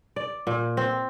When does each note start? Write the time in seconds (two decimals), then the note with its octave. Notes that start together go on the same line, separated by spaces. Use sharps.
0.16 D5
0.47 A#2
0.77 C4